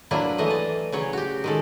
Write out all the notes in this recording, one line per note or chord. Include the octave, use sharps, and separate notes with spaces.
F#3 A#3 D4 E4 F4 B4
E3 A3 D#5
D5
C#3 F#3 C#5
F#4 G4
D#3 G#3 A4